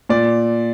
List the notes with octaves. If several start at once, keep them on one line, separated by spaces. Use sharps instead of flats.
A#2 D5